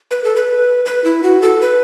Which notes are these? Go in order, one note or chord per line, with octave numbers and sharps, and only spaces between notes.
B4
A4
B4
B4
E4
F#4
A4
B4